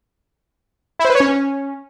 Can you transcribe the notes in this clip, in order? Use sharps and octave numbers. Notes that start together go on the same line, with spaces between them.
E4
C5
B4
C#5
C#4